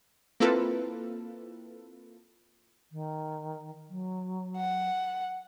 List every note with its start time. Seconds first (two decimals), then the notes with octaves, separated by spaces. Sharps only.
0.40 A#3 C4 E4 F4 A4 B4
2.92 D#3
3.89 F#3
4.57 F#5